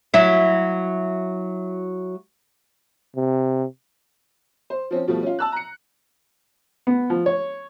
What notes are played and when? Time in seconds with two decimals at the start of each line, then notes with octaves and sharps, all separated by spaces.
0.14 F#3 E4
3.16 C3
4.70 C5
4.91 F3 C4 C#4
5.08 B2 F3 G3 A3
5.23 C#4 F4
5.39 A5 E6 F#6
5.52 A#5 C#7
6.87 B3
7.10 F3
7.26 C#5